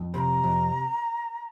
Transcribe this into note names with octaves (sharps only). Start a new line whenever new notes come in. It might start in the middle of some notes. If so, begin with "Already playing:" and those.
Already playing: F2
C3 A#5 B5
F2